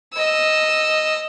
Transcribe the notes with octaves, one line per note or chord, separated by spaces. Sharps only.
D#5 E6